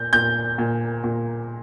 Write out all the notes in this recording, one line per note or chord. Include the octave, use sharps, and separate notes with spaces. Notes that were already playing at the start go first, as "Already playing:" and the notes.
Already playing: A#2 G6
A#2 G6
A#2
A#2